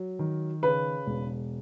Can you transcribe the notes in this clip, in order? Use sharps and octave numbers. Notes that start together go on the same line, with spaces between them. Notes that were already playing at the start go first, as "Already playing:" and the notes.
Already playing: F#3
D#3
C#3 B4
E1